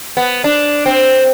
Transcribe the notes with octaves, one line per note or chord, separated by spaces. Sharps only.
B3
D4
C4